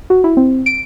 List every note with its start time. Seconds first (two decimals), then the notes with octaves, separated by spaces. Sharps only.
0.10 F#4
0.24 E4
0.37 C4
0.66 D7